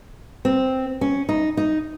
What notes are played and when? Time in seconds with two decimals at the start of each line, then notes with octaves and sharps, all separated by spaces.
0.45 C4
1.01 C#4
1.29 D#4
1.57 D#4